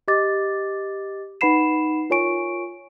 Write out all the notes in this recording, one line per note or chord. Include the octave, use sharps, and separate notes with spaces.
G4 D#5 D6 A6
D#4 B4 F#5 B5 C7 E7
F4 A#4 C#5 G#5 C#6 D7